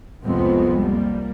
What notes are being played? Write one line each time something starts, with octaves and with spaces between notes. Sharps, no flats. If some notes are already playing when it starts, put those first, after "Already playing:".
C2 F2 C3 G#3 B3 C4
G3 A#3